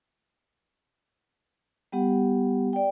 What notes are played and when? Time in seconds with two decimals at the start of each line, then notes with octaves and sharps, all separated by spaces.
1.92 G3 B3 G4 F#5
2.73 D5 G5